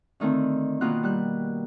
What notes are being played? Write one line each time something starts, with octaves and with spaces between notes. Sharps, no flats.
D3 D#3 A3 C4
B2 D#3 A#3 D#4 F4 F#6
G3 F#6